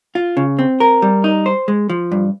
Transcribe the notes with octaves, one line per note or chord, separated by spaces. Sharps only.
F4
C#3
C4
A#4
G3
D#4
C5
G#3
F3
G2